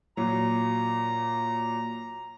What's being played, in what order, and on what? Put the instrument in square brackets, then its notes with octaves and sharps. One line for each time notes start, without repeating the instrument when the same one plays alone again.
[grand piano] A#2 F#3 [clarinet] A#5